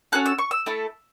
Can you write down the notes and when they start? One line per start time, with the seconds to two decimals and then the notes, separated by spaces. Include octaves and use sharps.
0.12 C#4 F#4 A4 F#6
0.26 E6
0.38 C#6
0.51 E6
0.66 A3 E4 A4